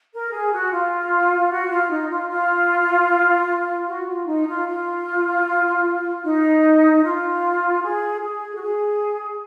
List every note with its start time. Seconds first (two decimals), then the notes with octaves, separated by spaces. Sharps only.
0.12 A#4
0.32 G#4
0.52 F#4
0.71 F4
1.50 F#4
1.70 F4
1.90 D#4
2.09 F4
2.29 F4
3.87 F#4
4.07 F4
4.27 D#4
4.47 F4
4.67 F4
6.23 D#4
7.02 F4
7.83 G#4
8.21 G#4
8.55 F#4
8.61 G#4